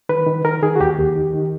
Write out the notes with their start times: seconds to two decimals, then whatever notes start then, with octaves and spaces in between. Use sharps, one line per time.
0.09 D#3 B4
0.27 D#3
0.44 D#3 A#4
0.63 D#3 G#4
0.75 F#4
0.80 D#2 G4
0.98 D#2
1.15 D#3
1.33 D#3